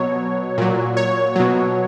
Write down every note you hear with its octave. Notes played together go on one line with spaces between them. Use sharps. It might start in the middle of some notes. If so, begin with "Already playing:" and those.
Already playing: B2 F#3 C#5
A#2 F#3
C#5
B2 F#3